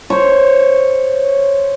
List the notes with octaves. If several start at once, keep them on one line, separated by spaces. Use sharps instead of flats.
C5 C#5